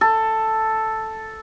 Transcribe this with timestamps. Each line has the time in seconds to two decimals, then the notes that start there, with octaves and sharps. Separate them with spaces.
0.01 A4